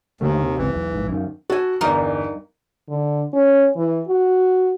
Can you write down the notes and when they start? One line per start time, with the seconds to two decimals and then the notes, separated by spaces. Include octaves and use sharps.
0.21 D#2 D3 D#3 A3
0.42 C3
0.58 G#1 C#2 E3 C4
0.70 B1 E2
0.94 A#1 G#2
1.08 F#2 D#3
1.50 F#4 A4 G#5
1.81 G1 E2 G3 D#4 A#4
2.89 D3
3.34 C#4
3.76 E3
4.08 F#4